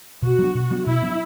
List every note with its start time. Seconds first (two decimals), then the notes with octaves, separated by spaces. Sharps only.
0.22 B2 F#4
0.39 F#3 B3 D4
0.55 B2
0.71 F#3 B3 D4
0.87 B2 E4
1.02 F#3 B3 D4